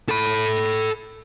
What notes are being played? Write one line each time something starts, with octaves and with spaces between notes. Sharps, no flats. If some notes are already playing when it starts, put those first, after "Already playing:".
A4 B5